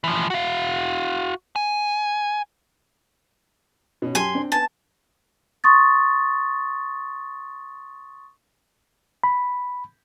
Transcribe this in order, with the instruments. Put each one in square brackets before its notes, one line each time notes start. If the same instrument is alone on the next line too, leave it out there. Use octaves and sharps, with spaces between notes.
[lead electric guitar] E3 F3
F#4 F5
G#5
[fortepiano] B2 C#4
[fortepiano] F#2 G4 [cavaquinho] G#5 C6
[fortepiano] C4 D4
[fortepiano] B3 G#5 [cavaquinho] A5
[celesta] C6 C#6 D#6 A6
[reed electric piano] B5